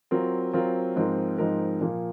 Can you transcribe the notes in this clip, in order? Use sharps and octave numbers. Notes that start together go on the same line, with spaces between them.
F#3 C4 F4 A#4
F#3 C4 F4 A#4
G#2 F3 C4 D#4 A#4
G#2 F3 C4 D#4 A#4
A#2 F3 A#3